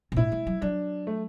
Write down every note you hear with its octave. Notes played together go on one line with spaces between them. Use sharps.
B2
A2 E4
A3
F#3
F#3 D4
A3